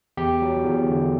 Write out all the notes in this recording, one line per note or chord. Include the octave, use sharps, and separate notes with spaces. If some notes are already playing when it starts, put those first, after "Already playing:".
E2 G4
F#3
E2
D3